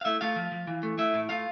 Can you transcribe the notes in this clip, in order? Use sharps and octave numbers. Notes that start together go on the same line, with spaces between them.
F5
A3 E4 E5
A3 F4 F5
F3
F3
E3
A3
A3 E4 E5
A2
A3 F4 F5